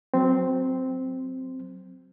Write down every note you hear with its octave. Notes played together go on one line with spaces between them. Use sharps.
F#3 C4